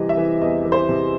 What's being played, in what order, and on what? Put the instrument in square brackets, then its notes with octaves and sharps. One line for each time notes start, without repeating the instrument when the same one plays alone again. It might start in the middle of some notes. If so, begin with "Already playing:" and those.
Already playing: [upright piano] C3 E3 G3 D#5
E5
E3
E2 D#5
E3
C5
C3